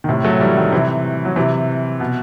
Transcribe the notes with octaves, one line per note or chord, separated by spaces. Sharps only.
D#3
A2 C3
F#3 A3
E3 G3
D#3 F#3
C3 E3
F#3
C3 E3
B2